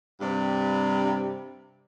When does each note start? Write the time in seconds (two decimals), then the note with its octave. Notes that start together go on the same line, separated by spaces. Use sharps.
0.21 G2 C3 G3